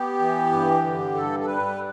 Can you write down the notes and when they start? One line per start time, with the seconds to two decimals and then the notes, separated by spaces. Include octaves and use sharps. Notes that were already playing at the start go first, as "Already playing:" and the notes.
Already playing: B3 G4
0.20 E3
0.51 G2
0.84 D3
1.14 G2 A4
1.40 A4
1.47 G3 B4